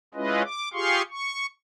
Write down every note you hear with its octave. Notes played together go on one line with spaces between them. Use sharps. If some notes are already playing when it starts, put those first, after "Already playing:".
G#3 C#4 E4 F4 B4 D#5
D6
F4 G4 G#4 F5 C6 C#6
C#6